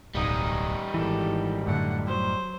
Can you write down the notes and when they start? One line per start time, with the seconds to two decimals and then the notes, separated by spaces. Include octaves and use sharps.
0.15 D1 B1 A2 G3 D#4 D#6
0.94 G#1 E3 G4 A4
1.67 F#2 A2 D3 F#5
2.07 F#3 C5